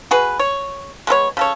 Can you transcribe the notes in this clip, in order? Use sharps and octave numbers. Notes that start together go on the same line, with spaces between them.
F#4 G#4 B4
C#5
G#3 B3 A4 C#5
C#3 A4 C#5